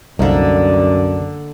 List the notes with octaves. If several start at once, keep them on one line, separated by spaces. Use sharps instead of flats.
C2 F#2 D3 A#3 D#4 D5 F5